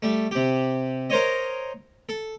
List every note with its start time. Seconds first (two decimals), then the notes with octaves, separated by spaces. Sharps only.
0.02 G3 A3
0.31 C3 G4
1.10 A#4 C5 C#5 D#5
2.09 A4